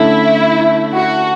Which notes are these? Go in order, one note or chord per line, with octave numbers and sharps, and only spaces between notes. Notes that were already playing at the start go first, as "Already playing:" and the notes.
Already playing: D3 A3 C#4 E4
F#4